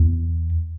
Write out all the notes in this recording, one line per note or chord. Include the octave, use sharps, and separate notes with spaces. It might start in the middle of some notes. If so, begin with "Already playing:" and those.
Already playing: E2